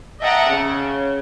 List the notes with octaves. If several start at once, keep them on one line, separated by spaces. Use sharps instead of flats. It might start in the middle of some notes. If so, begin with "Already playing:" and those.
D#5 E5 F#5 G5 A5 A#5
C#3